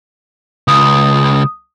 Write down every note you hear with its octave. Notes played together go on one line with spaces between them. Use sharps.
C#2 D#6